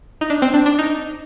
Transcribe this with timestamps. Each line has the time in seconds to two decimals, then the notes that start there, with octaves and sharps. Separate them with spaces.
0.21 D#4
0.30 D4
0.42 C4
0.54 D4
0.66 D4
0.79 D#4